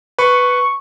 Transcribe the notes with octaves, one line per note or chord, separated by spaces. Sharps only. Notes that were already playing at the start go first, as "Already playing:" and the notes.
B4 C#6